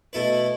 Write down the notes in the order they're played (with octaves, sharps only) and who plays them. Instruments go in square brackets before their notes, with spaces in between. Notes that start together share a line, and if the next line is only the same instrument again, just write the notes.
[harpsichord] B2 A3 E4 B4